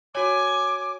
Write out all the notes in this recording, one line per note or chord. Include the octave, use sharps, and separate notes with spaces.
F#4 C#5 G#5 D6